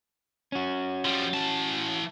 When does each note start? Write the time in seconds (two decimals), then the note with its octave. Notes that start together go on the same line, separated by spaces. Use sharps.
0.52 C#4 F#4
1.05 F3 G3
1.34 E3 A5